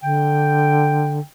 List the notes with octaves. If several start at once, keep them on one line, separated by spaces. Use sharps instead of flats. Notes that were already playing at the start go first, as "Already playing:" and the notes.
D3 G5